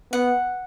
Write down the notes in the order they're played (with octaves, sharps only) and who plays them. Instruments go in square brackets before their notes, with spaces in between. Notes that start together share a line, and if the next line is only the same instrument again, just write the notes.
[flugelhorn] B3 [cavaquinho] F#5